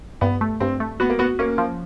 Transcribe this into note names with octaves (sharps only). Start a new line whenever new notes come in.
G2 B3
A3
G2 C4
A3
B3 F#4
A#3
B3 F#4
A#3 C#4
F3